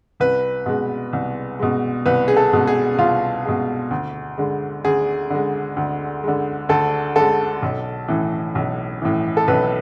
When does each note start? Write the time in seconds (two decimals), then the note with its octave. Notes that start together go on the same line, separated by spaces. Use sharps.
0.20 C2 B4
0.66 B2 G#3
1.13 C2
1.59 B2 G#3
2.06 C2 B4
2.28 G#4
2.37 A4
2.52 B2 G#3
2.67 G#4
2.98 C2 F4
3.45 B2 G#3
3.91 D2
4.38 D3 G#3
4.84 D2 G#4
5.30 D3 G#3
5.77 D2
6.23 D3 G#3
6.69 D2 A4
7.16 D3 G#3 A4
7.62 B1
8.08 A2 E3
8.55 B1
9.02 A2 E3
9.37 A4
9.48 B1 B4